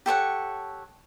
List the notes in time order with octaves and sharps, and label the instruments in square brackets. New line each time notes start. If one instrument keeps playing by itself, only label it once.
[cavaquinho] G4 A4 C#5 F#5